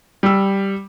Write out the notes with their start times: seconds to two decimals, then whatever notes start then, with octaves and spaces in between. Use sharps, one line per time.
0.23 G3 E6